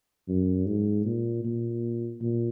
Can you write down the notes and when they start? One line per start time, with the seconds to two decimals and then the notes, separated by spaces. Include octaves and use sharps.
0.28 F#2
0.66 G#2
1.06 A#2
1.45 A#2
2.21 A#2